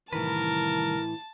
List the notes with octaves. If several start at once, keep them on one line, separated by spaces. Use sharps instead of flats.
C2 A2 D#3 E3 A#4 B4 A5